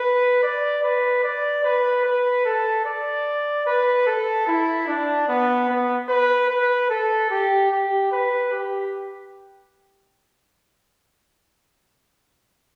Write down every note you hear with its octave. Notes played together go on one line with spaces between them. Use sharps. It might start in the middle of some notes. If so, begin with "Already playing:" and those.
Already playing: B4
D5
B4
D5
B4
B4
A4
D5
B4
A4
E4
D4
B3
B3
B4
B4
A4
G4
G4
B4
G4